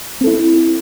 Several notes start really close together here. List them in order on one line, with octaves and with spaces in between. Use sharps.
C4 A4 E4